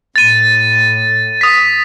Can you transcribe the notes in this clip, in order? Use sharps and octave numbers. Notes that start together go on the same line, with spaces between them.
A2 A6 D#7
D#6 B6